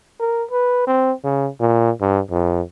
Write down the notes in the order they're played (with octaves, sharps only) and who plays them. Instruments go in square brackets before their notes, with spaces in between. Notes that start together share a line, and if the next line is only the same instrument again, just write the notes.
[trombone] A#4
B4
C4
C#3
A#2
G2
F2